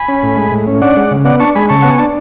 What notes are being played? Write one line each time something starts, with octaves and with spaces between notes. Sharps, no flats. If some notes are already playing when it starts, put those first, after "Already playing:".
Already playing: G#5 B5
C#4
A2
G#3
A2
C#4
D4 D5 F#5
G#3
C#3
B3 D5 F#5
D4 A5 C#6
G#3 G#5 B5
C#3 A5 C#6
B3 F#5
G#5
D4 A5